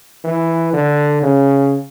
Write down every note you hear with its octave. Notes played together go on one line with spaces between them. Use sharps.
E3
D3
C#3